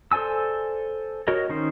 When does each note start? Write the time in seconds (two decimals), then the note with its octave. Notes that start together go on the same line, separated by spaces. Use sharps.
0.11 A4 C5 D5 G#5 E6
1.28 F#4 A#4 C#5 D#5
1.49 D#3 C#4 D#4 C5